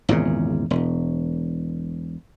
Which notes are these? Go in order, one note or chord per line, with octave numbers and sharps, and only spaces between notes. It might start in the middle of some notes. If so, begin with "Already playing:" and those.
G#1 E2 A#2 C#3
E1